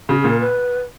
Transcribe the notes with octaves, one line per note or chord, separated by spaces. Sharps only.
C#3 F#4
G#4
A#2
A#4
B4